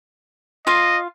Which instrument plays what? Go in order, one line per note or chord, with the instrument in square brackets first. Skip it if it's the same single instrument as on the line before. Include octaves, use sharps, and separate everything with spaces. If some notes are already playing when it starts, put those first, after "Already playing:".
[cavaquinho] F4 F5 [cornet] D#5